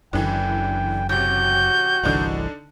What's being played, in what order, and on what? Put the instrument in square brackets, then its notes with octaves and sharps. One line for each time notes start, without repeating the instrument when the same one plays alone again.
[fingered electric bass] F#1 F#2 [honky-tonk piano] D3 E3 [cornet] G5
[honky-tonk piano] A1 C3 [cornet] F#4 [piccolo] G6
[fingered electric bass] G1 C2 E3 [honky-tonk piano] D3 D4 D#4